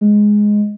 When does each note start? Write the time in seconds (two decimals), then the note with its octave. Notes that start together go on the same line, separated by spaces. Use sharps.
0.01 G#3